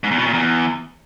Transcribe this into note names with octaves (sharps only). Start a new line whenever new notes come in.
G#2
E2
B2
A#2
E2